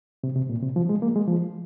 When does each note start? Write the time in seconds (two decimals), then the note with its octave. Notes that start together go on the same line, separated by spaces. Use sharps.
0.24 C3
0.36 C3
0.49 A#2
0.63 C3
0.76 F3
0.89 G#3
1.02 A#3
1.16 G#3
1.28 F3